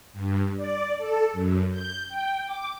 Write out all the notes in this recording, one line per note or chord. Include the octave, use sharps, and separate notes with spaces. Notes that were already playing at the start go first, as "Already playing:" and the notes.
G2
D5
A4
F#2
G6
G5
D6